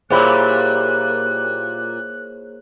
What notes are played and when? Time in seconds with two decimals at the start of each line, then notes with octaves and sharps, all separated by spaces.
0.10 A#2 G3 A#3 E4 G#4 C5 C#5 F#6